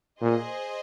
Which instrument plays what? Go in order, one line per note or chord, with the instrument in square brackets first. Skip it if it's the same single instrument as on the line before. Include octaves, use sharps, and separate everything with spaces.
[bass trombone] A#2 [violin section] G#4 C5 D#5